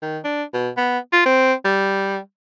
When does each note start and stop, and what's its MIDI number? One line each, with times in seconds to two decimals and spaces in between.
0.02 0.18 51
0.24 0.44 62
0.53 0.69 47
0.77 0.98 59
1.12 1.23 65
1.26 1.54 60
1.65 2.18 55